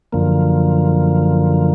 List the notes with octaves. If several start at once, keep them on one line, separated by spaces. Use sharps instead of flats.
F#2 D3 F3 A#3